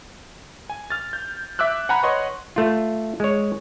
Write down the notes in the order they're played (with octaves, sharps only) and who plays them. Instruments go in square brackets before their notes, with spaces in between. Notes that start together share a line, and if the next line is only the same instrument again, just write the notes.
[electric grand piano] G#5
F6 A6
G6
E5 D6 E6 F#6
F#5 G#5 A#5 B5 F#6
B4 C#5 D#5 F#5 C6 C#6
[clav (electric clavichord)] A3 F4
G#3 C#5